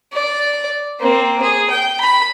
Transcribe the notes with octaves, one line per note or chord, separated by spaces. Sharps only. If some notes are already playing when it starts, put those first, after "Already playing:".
D5
A#3 C4
G#4
G5
B5